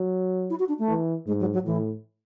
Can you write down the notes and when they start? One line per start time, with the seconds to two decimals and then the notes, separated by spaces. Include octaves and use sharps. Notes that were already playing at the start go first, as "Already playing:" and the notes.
Already playing: F#3
0.50 E4
0.59 F#4
0.68 D4
0.79 A3
0.88 E3
1.27 G#2 G#3
1.40 F#3
1.53 F#3
1.65 A2 E3